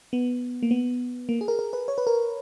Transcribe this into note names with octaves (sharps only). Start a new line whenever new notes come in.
B3
A#3
B3
A#3
G#4
A#4
A#4
B4
C#5
B4
A#4